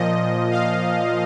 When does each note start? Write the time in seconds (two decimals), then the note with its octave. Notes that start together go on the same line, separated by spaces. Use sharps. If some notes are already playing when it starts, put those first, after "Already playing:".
Already playing: A#2 F3 D#5
0.51 F5